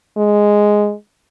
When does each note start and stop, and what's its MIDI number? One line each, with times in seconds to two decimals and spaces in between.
0.17 0.93 56